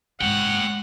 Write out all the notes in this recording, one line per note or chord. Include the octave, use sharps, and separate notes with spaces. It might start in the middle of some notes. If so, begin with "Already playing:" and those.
G#1 G#3 C#5 F#5 G5